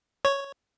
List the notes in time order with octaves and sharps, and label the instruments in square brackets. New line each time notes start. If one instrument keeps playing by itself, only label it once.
[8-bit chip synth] C#5